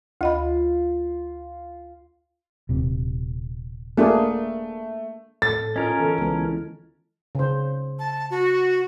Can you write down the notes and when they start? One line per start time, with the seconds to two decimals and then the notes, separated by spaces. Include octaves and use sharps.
0.21 D2 F4 D#5 B5
2.69 D#1 C3
3.97 A3 A#3 D4 G#4
5.42 A2 A4 A6
5.76 C#4 F4 A#4 D#5
6.00 D3 E3 B3 A4
6.18 C#2 E3 G#3 B3 A4
7.35 C#3 C5
7.99 A5
8.31 F#4